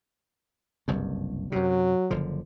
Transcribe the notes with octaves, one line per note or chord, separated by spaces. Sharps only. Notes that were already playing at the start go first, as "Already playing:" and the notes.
F#1 C2 G2
F#2 C3 F#3
F#1 D3 F3